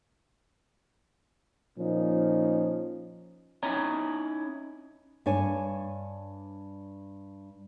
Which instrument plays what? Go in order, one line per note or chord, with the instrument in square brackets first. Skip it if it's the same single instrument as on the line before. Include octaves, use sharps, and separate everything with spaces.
[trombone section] A#2 F3 C#4 D#4
[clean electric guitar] C#4 D#4 E4 C#5 A#5
[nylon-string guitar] G2 D4 C#5 G#5